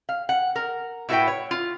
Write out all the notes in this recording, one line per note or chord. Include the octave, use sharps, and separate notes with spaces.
F5
F#5
A#4
A2 E4 F#4 B4 E5 G5
C#5
F4